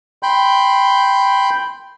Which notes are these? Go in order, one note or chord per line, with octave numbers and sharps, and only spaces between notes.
G5 B5 C6 G6